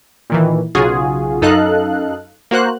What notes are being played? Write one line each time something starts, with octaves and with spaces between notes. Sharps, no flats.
A#2 D#3 E3
B1 C#3 F4 F#4 G#4
F#2 D#4 A4 D#5 F5 F#6
A#3 F#4 C5 F#6